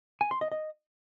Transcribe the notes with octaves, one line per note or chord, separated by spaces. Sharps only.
G#5
C6
D#5
D#5